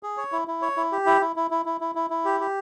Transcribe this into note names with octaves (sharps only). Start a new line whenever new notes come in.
G#4
C#5
E4
E4
C#5
E4
G4
E4
E4
E4
E4
E4
E4
E4
E4
G4
G4